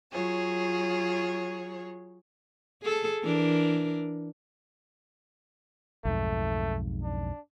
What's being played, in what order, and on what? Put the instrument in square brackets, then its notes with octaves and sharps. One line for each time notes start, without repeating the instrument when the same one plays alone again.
[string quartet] F#3 F4 G#4 C#5
[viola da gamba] G#4 A4
E3 D4 A#4
[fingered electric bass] B1 F2 G#2 [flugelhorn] A3
[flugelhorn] D4